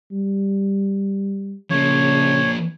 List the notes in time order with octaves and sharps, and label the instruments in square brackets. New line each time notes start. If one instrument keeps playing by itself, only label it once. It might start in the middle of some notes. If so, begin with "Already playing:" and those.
[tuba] G3
[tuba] C#3 [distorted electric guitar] F3 A#3 [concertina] C#5